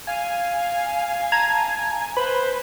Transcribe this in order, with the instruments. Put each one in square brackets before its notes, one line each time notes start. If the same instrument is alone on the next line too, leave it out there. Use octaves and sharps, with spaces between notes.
[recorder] F5 [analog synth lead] G#5
[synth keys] A5 A#5 G#6
[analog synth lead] B4 [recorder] C5 [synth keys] B5